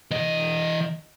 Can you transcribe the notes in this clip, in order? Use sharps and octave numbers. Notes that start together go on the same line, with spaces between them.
E3 D#5